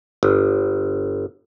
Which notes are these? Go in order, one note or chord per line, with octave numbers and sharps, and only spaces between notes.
G1